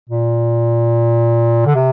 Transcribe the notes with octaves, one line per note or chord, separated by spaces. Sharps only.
A#2
D3
C3